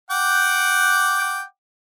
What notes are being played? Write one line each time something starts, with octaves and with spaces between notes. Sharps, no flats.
F#5 G5 D6